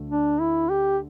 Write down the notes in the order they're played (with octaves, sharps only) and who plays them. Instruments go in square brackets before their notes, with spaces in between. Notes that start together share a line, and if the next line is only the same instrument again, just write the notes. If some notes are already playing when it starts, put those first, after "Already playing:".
Already playing: [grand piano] D2 D3 A3
[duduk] D4
E4
G4